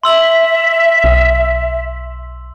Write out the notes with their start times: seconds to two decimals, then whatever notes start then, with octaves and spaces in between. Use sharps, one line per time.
0.04 E5 C6 E6 F#7
1.04 B1